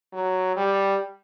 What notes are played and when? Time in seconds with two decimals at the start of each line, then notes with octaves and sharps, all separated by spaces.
0.13 F#3
0.57 G3